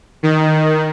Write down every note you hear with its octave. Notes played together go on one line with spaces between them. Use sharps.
D#3